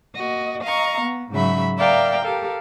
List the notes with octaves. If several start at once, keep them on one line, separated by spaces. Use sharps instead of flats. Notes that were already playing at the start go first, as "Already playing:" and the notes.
A#3 F#4 D#5
D#5 F5 A#5 C#6
B3
G#2 C#3 F#3 E5 B5
A#4 D5 E5 F5 G5 A#5
G4 A4 A#4 F5